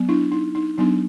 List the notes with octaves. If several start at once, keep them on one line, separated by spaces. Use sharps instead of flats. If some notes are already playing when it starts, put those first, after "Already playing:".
Already playing: F#3 B3
D4 E4
D#4
D#4
F#3 B3 D4 D#4